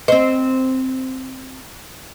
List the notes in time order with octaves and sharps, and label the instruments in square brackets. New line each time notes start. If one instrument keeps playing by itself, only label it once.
[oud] C4 C5 [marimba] D#5